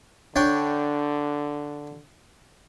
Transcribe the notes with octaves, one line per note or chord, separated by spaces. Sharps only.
D3 D4 C#5 G5